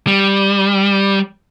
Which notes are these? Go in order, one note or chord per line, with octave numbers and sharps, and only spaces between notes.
G3